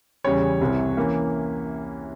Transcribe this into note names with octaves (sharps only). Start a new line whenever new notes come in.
E2 C#3 G3 C#4 C#5
C2 C3 E3
E3 A#3 C#4